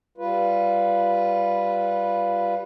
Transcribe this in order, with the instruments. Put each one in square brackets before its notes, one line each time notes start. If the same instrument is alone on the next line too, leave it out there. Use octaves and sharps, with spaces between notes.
[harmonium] G3 F4 B4